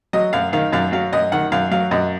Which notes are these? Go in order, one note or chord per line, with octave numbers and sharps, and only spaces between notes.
F#3 D#5
F#2 F5
D#3 F5
F#2 F5
F#3 F5
F#2 D#5
D#3 F#5
F#2 F5
F#3 F5
F#2 D#5